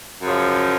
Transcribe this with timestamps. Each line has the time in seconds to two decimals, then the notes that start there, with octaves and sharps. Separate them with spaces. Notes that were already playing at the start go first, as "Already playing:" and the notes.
0.22 F#2 C#3 F3